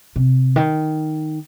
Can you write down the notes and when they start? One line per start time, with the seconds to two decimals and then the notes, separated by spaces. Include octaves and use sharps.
0.16 C3
0.56 D#3